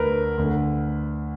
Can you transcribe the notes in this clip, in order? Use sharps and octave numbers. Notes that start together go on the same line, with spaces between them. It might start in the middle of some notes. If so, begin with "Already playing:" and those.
Already playing: D2 D3 A#4 B4
D2 D3